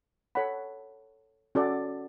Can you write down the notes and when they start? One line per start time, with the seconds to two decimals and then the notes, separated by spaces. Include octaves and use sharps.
0.35 A4 C#5 F#5 B5
1.55 C#4 F#4 A4 D5